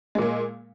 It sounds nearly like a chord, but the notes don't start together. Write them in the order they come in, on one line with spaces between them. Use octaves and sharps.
G#3 A#2 A#3